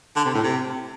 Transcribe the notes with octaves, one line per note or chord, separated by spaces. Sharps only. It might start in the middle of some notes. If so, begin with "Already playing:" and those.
D3
C3
A2
C3